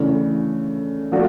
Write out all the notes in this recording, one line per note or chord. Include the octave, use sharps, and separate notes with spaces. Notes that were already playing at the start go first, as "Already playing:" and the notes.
Already playing: C#3 E3 A3 D4
F3 A3 D4 F#4